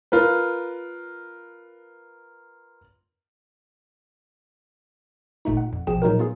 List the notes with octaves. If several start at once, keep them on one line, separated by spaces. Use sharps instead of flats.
F4 A#4 B4
G1 A#2 A3 D#4
F#5
F2
A#1 B2 F3 G#4 G5 E7
A#2 F#3 D#4 F#4 A#4
B3 F4 G#4